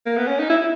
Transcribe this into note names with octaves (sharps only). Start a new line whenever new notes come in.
A#3
B3
C#4
D#4
E4